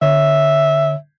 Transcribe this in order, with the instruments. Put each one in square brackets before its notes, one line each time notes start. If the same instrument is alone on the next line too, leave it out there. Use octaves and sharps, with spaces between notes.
[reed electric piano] D3 C#5 [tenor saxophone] E5